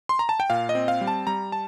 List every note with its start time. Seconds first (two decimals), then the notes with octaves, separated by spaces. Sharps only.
0.09 C6
0.19 A#5
0.29 A5
0.40 G5
0.50 A#2 F5
0.69 D#5
0.75 C4
0.88 F5
1.01 G3
1.07 A5
1.27 G3 A#5
1.52 A5